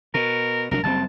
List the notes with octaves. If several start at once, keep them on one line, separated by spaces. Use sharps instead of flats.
B2 A#4
C2 F#3 D4 A#4
F#1 G3 C4 A5